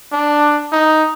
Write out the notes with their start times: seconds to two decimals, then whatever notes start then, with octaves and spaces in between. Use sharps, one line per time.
0.13 D4
0.72 D#4